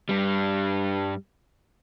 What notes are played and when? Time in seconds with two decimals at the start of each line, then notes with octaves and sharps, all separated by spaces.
0.09 G2 G3